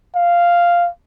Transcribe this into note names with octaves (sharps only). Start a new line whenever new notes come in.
F5